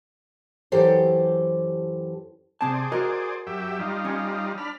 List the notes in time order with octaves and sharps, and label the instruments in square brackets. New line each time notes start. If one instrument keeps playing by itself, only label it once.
[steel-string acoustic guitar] F#2 E3 G4 A4 C5
[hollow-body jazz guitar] C3 C4 A5 [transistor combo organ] G#4 C5 D5
[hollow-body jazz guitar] F#4 A#4 D#5
[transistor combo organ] F#2 G4 E5
G3 D#4 F4
[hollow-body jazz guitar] C#4
[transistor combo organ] D4 B5 F6